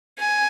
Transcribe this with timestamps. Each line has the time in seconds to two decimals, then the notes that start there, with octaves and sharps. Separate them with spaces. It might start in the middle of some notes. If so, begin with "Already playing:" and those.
0.19 G#5